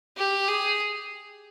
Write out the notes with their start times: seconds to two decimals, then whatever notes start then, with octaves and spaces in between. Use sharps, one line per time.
0.17 G4
0.48 G#4